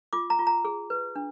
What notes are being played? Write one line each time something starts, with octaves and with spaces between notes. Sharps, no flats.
F4 D6
A#5
F4
A#5
G#4
B4
D4